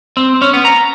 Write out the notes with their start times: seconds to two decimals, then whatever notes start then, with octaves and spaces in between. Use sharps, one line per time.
0.17 C4
0.42 C#4
0.53 B3
0.65 A#5